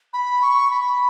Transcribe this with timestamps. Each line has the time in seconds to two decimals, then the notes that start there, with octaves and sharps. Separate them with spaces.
0.13 B5
0.42 C#6
0.71 B5